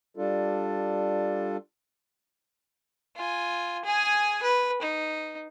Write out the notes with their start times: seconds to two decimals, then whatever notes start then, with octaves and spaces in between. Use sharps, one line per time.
0.17 G3 D4 F4 A4
3.16 F4 G#5
3.85 G#4 G#5
4.42 B4
4.82 D#4